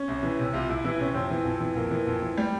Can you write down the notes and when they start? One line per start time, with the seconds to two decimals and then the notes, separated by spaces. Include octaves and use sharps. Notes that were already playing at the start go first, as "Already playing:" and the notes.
Already playing: C#4
0.08 C2
0.23 E3
0.39 C3
0.53 C2 F4
0.69 C2 E4
0.85 E3 E4
0.99 C3 C#4
1.15 F2 C4
1.30 E3
1.45 F2
1.61 E3
1.75 F2 A#3
1.91 E3
2.07 F2
2.22 E3
2.37 G3